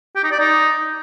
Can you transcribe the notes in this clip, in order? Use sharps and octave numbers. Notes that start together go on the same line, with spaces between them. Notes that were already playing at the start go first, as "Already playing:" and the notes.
G4
D#4
D5
D#4